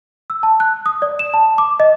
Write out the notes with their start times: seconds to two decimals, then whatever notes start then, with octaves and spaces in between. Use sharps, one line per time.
0.30 E6
0.43 A5
0.60 F#6
0.86 D#6
1.02 D5
1.19 E7
1.34 A5
1.58 D6
1.80 D#5